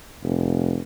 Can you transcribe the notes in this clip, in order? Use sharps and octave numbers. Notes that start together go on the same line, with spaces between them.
F1